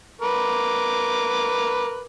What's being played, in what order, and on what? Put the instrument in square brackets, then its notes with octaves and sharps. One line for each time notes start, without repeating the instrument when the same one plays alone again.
[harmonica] A#4 B4 D6